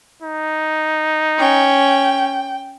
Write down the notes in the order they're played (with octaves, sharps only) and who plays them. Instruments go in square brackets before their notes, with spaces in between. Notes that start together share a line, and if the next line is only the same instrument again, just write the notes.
[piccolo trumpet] D#4
[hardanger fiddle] C#4 [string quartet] G5